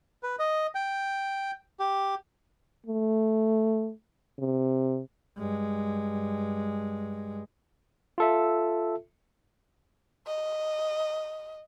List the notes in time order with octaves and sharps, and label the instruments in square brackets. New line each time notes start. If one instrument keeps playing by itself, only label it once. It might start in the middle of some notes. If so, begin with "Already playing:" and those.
[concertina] B4
D#5
G5
G4
[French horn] A3
C3
[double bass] G2 G#3
[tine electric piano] F4 A4 E5
[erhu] D#5